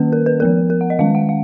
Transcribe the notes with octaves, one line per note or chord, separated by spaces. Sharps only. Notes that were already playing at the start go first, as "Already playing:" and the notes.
Already playing: D#3 A#3 C#4 B4
A#4
B4
F3 B3 A#4
A#4
F#5
D#5
D#3 G#3 C#4 F5
F#5
F5